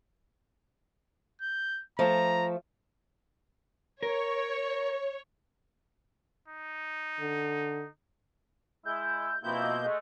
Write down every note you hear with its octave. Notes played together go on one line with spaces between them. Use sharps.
G6
F3 A3 A#5
A#4 C#5
D#4
D3
G#3 E4 G6
B2 F3 A#3 C4 E4 G6
D#5
G#3 A3